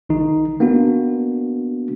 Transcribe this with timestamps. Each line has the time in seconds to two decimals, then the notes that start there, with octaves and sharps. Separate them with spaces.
0.09 A#1 D#3 D#4
0.60 A#3 B3 D4 F#4